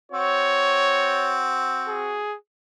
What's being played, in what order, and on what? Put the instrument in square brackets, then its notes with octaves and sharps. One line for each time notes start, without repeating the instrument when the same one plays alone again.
[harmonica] C4 F#4 [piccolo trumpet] C#5
[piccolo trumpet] G#4